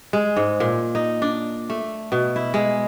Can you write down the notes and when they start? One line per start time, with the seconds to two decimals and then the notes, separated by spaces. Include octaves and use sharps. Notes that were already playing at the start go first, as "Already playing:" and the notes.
0.13 G#3
0.36 G#2
0.60 A#2
0.95 D#4
1.22 D4
1.70 A3
2.12 B2
2.36 E4
2.54 G#3